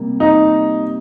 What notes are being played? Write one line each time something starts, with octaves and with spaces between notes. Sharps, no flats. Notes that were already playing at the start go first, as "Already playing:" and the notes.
Already playing: C3 G3 A#3
D#4